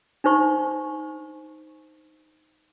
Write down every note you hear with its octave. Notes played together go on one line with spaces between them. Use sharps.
D4 D#4 C5 C#6